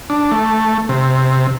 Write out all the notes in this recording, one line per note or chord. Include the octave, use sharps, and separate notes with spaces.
D4
A3
C3